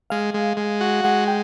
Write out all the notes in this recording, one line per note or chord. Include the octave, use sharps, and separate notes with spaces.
G#3 F5
G#3
G#3
F#4
G#3 F#5
G5